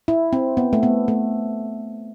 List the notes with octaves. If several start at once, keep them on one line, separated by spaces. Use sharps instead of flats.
E4
C4
B3
A3
B3
A3